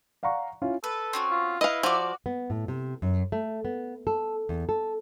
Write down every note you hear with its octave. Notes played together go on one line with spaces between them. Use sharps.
D5 F5 F#5 A#5 C#6
C#4 E4 F4
A4 B4
C4 C#4 F#4
F4
E4 B4 D#5 F5
F3 F#4 D5
B3
A2
C3
F#2
A3
B3
A4
E2
A4